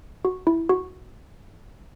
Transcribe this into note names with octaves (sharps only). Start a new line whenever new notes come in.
F#4
E4
F#4